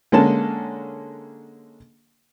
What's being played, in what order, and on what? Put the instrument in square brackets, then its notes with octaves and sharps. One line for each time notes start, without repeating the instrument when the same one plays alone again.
[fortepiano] D3 G#3 A#3 C#4 A5